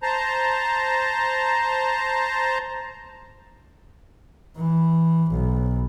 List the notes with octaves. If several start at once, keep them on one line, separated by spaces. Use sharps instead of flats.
C5 A5 A#5
E3
B1